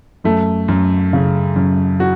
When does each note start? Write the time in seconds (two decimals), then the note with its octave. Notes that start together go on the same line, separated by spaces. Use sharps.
0.24 F#2 A3
0.68 F#2
1.13 C#3
1.56 F#2
2.00 F#4